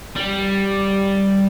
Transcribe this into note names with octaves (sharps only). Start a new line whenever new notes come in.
G3